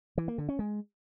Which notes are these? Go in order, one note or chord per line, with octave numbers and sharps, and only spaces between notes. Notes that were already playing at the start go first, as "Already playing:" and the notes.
E3
A#3
D3
C#4
G#3